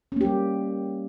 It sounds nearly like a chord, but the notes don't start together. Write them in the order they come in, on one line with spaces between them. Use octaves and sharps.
C#4 A#3 G4 G3